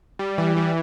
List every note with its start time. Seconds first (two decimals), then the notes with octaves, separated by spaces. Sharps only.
0.19 G3
0.38 E3
0.57 G3